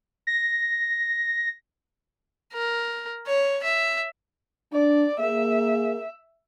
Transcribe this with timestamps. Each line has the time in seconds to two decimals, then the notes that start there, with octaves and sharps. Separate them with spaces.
0.27 A#6
2.53 A#4
3.27 C#5
3.63 E5
4.73 D4 D5
5.20 A#3 G#4 E5